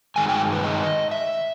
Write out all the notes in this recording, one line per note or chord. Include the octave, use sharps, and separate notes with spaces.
G2 D#3 G#3 G#5
G5
B4
D#5
E5